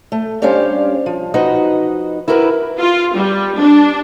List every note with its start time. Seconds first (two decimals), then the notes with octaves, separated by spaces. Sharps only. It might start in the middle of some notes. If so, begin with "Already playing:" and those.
0.12 A3
0.42 G3 C#4 D4 G4 C5 F5
1.06 F3
1.34 F3 D#4 F#4 B4 D#5
2.28 E4 F#4 G4 A#4 B4
2.80 F4
3.16 G3
3.60 D4